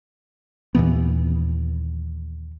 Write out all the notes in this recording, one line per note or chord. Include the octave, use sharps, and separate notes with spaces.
D#2 A#2 E3 B3